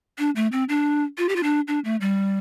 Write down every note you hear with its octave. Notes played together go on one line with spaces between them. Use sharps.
D4
A3
C4
D4
F4
G4
F4
D4
D4
A3
G3